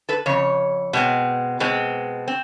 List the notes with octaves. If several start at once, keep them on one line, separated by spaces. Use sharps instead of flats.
A4 B4
F2 C#3 C#5
B2 G#3 C4
B2 G#3 C4
C4